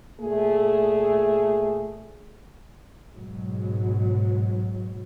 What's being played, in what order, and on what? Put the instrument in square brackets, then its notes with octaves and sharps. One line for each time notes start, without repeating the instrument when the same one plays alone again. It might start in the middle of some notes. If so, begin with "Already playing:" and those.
[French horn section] A#2 A3 G#4
[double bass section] G#2 B2 F#3